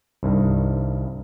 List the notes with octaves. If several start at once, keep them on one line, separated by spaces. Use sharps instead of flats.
C2 G2 D#3